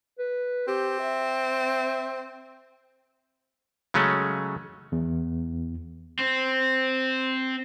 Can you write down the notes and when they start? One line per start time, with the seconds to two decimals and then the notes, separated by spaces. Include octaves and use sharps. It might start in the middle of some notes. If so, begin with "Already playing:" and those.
0.19 B4
0.68 C4 G4
1.00 E5
3.94 C#3 F#3 G#3 A3 C#4
4.92 E2
6.19 C4